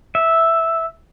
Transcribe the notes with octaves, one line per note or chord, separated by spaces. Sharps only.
E5